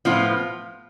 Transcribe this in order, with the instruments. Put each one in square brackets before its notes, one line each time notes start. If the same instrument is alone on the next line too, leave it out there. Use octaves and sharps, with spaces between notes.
[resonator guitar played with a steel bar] A2 F3 B3 F4